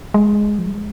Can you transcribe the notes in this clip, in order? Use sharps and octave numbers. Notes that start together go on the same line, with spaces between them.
G#3
F3
G3
G#3